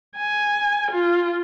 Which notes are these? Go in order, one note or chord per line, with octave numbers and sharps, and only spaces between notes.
G#5
F4